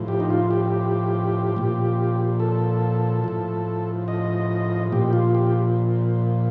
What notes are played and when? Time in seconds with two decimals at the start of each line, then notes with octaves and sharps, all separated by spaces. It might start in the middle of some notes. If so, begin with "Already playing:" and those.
Already playing: A2 F3
0.08 G4
0.20 D#4
0.30 F4
0.51 G4
1.57 A#2 F3
2.40 A4
3.24 A2 F3
4.08 D#5
4.92 A#2 F3 G4
5.13 F4
5.35 G4